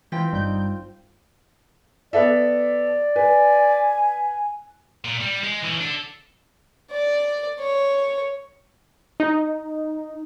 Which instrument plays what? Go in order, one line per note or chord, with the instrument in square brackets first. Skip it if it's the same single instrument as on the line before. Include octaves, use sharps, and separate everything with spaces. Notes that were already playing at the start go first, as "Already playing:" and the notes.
[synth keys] E3 B6 [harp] C4 F4 G5
[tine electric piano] G1 G2 [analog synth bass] G3 [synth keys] D#4 G6
[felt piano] B3 A4 E5 [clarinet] D5
[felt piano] B4 [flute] G#5
[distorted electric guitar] A#2
G3
G#3
E3 C#4
D4 A4
[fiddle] D5
C#5
[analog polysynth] D#4